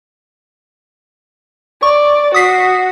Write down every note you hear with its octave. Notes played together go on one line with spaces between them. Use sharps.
D5 C#6
F#4 D#6 B6 C7